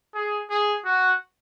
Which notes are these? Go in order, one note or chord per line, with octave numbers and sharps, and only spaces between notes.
G#4
G#4
F#4